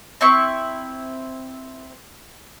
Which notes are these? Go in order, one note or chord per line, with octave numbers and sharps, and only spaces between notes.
C4 E4 C#6